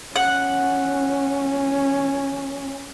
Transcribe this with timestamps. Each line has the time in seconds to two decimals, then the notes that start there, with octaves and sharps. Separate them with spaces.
0.16 C#4 F#5